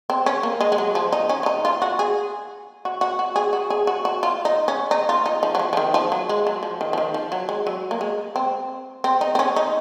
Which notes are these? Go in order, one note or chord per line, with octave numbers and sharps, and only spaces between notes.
C4
C#4
A#3
G#3
G#3
F#3
F3
D#4
C#4
F4
D#4
F4
F#4
G#4
F#4
F#4
F#4
G#4
F#4
G#4
F#4
F#4
F4
D#4
C#4
D#4
F4
D#4
F3
F#3
F3
F3
D#3
F3
F#3
G#3
F#3
F3
D#3
F3
D#3
F3
F#3
G#3
F#3
A#3
G#3
C4
C4
D#4
C4
C#4
D#4